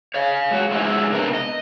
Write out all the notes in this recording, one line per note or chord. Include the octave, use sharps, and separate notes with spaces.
C#5 F5
G#3 F#4
F#3 G#3 C#4 D#4 E4 F#4
C3 A#3 B3 D4 A#4
D#5